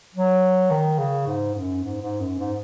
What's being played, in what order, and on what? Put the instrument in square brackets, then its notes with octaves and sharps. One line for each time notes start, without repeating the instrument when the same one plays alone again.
[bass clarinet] F#3
D#3
C#3
G#2
F#2
G#2
G#2
F#2
G#2